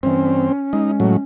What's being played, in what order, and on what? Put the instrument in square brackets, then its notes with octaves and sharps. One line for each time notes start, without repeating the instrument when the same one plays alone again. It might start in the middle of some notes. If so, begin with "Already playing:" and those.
[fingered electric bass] G2 E3 [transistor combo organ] C4 [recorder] C#4
[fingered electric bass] G#3 [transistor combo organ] D#4
[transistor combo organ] A2 F#3